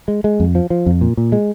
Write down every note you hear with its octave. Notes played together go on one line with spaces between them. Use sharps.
G#3
G#3
F2
F3
F3
F2
A#2
A#2
G#3